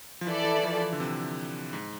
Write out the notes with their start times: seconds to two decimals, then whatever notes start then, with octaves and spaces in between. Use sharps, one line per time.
0.21 F3
0.27 E3 E4 A4 D5
0.44 E3
0.59 E3
0.63 F3
0.82 E3
0.92 D3
1.00 C3
1.73 G#2